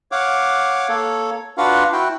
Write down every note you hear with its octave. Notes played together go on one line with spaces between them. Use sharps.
C#5 F5 F#5 D6
A#3 A4 C#5
D4 F4 F#4 B4 F5 F#5
E4 F#4 G5